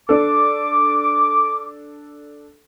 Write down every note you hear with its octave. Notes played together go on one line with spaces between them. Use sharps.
D4 A4 D6